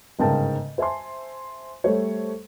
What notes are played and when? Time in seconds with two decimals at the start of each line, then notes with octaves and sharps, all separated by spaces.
0.19 G1 G#2 C#3 A#4 G5 A5
0.78 C5 E5 G#5 A5 C6
1.84 G3 A3 A4 C5 C#5